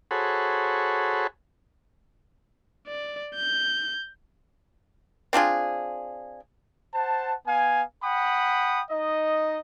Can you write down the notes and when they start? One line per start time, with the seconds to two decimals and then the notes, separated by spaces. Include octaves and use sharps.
0.11 F#4 G#4 A4 C5 C#5 B5
2.87 D5
3.36 G6
5.33 C4 D4 F4 G#4
6.94 C5 F#5 A5
7.47 B3 F5 G#5
8.03 F#5 G5 B5 D#6
8.90 D#4 D#5